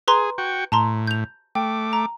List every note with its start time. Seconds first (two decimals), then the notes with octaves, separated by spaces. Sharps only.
0.08 G#4 B4 A#5 C6
0.38 F#4 G5 C#6
0.72 A2 A5 A#5 C6
1.07 G6 F7
1.55 A3 G5 D6
1.93 A#5